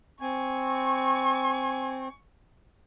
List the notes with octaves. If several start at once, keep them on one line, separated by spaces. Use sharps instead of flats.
C4 G#5 C#6